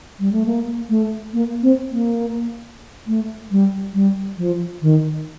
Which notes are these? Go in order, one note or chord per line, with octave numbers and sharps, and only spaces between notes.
G3
A3
A#3
A3
A#3
C4
A#3
A3
G3
G3
F3
D#3